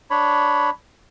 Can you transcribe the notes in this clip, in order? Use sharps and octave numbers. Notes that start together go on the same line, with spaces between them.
D4 C#5 B5